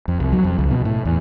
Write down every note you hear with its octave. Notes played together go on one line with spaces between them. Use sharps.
F2
C2
F#3
F2
C#2
B2
A2
E2